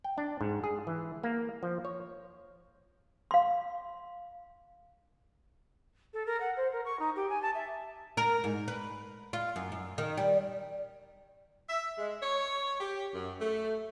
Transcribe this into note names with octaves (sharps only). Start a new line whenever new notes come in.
G5
D4
G#2
G#4
E3
A#3
F3
C#5
F5 C6
A4
A#4
F#5
C5
A#4
C#6
D#4
G4
G#5
A5
E5
A#4
G#2
B4
F4
F#2
F#2
D#3
G3
E5
G#3
C#5
G4
F#2
A3